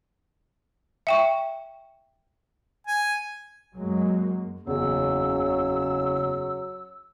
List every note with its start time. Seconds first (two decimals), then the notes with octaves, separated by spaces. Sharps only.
1.07 E5 G5 C#6
2.87 G#5
3.75 F#2 F#3 G#3 A#3
4.67 F#1 E2 C#3 F#3 E6